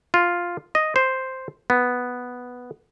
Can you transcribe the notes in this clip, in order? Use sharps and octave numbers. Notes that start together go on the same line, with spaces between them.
F4
D#5
C5
B3